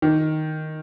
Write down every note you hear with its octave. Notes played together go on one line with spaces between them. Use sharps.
D#3